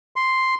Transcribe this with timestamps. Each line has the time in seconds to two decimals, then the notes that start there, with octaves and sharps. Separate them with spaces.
0.16 C6